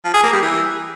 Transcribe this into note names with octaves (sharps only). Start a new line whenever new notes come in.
F3
G#4
A#3
G3
E3